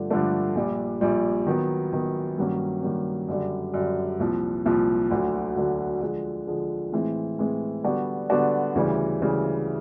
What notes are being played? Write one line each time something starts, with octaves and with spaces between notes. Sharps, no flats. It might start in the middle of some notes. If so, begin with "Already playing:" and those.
Already playing: G2 D3 F3 A3 D4
G2 D3 F3 A3 D4
A#1 A#2 G3
A#1 A#2 G3
D#3 F#3 B3
D#3 F#3 B3
G2 D#3 F#3 A#3 C#4
G2 D#3 F#3 A#3 C#4
F#2 D3 G3
F#2 D3 G3
C2 A#2 F3
C2 A#2 F3
D2 D3 F#3
D2 D3 F#3
D3 F3 G#3
D3 F3 G#3
A2 E3 G#3 C4
A2 E3 G#3 C4
D3 G3 B3 D4 F#4
D3 G3 B3 D4 F#4
D2 C#3 E3 G3
D2 C#3 E3 G3